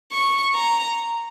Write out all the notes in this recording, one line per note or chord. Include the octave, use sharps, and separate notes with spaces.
C#6
A#5